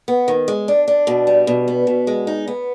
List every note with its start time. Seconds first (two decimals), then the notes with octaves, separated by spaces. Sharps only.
0.08 B3
0.28 D#3
0.48 G#3
0.68 D4
0.88 D4
1.07 B2
1.27 G3
1.47 B2
1.68 B3
1.87 B2
2.07 G#3
2.27 D#4
2.48 B3